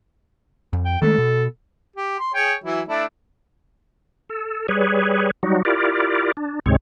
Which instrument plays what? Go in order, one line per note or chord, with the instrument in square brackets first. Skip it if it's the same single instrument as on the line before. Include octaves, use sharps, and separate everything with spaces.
[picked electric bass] F2
[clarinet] G5
[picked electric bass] D#3 G#3 A3 [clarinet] A4
[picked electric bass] B2
[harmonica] G4
C6
G#4 C#5 G5
E3 F#3 E4
A3 D4 E4
[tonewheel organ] A4
G3 G#4 B4 C#5
F#3 G3 D#4 F#4
E4 F4 G4 A#4 D5
D4
D2 G#2 C3 G#3 C4 C#5